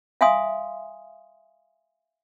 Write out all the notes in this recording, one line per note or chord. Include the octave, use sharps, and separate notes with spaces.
E5 F5 G#5 C6 D#6